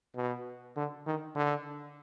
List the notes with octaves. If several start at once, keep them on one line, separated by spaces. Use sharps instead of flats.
B2
D3
D#3
D3